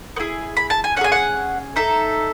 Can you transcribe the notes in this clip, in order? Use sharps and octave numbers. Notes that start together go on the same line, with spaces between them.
B3
E4 G#4
B5
A5
G#5
C#4 G#4 F#5 G#5
F#5
D#4 A4 E5